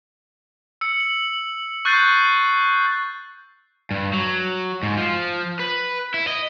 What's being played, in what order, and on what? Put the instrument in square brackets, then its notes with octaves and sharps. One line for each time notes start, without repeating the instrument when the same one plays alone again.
[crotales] E6 C#7
F#7
C#6 F#6 G6 A6 C7 D#7
[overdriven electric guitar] G2
F#3
G#2
F3
B4
E4
D#5